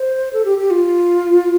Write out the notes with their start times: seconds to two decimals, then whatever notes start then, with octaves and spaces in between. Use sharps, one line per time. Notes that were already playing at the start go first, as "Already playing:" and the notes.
Already playing: C5
0.33 A4
0.45 G4
0.58 G4
0.71 F4